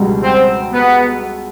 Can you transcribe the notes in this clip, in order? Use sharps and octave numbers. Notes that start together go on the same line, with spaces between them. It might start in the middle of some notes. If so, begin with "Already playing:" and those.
Already playing: C#2 B2 G3
C4
B3